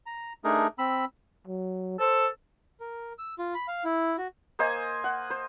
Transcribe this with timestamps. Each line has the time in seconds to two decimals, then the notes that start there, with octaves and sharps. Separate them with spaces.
0.06 A#5
0.44 A3 D4 D#4 G#4 A#4
0.78 C4 B5 E6
1.47 F#3
2.00 A4 C5
2.80 A#4
3.19 E6
3.39 F4
3.54 B5
3.68 F5
3.84 E4
4.18 F#4
4.59 A#3 C5 D#5 G#5
5.04 F#5
5.30 C5